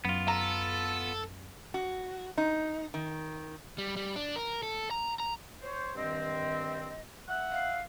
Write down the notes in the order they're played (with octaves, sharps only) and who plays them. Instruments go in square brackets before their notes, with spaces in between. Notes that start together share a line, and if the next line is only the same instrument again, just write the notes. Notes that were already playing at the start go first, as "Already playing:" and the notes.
[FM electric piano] F#2 [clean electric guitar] B3 F4
[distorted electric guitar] A4 [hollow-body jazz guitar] A#5
[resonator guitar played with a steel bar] F#4
D#4
D#3
[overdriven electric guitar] G3
G3
D4
A#4
A4
A#5
A#5
[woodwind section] C5 [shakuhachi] C#5
[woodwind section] G2 D#3 C4 [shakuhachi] D#5
[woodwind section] E5 F#5
[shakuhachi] F5